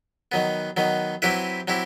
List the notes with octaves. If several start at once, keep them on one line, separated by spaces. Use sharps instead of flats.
D#3 F#3 B3
D#3 F#3 B3
F#3 C4 E4 G4 B4
F#3 C4 E4 G4